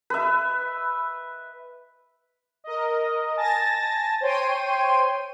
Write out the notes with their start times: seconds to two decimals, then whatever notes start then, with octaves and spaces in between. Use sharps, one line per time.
0.10 B4 E5
2.64 A#4 D#5
3.37 G#5 A5 A6 A#6
4.21 C5 C#5 G5 C6 D#7